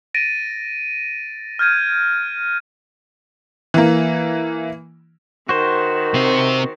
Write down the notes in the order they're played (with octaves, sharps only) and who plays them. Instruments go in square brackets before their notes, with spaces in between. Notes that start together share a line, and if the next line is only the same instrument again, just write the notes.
[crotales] A6 A#6 D7 D#7
F6 G6 G#6 D#7
[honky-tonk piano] E3 A#3
[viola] D#3 [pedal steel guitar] F#4 C5
[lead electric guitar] C3 C4